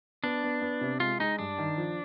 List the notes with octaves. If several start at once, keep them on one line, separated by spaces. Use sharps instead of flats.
B3 D4
B3
B3
C3
G#3 F4
G#3 D#4
G2 D4
D#3
F3